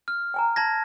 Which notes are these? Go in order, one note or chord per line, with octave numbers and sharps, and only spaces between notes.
F6
G5 G#5 A#5
A5 G#6 A#6